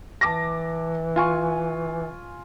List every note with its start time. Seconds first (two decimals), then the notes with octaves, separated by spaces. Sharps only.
0.21 E3 A5 D6 A#6
1.16 F4 G#5 C#6